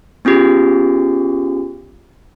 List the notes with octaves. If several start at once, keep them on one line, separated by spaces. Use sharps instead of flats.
B3 C#4 F4 G4 G#4